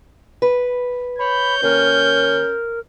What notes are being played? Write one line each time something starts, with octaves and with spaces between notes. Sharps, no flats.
B4
C#5 B5 G6
D#2 C#4 A#4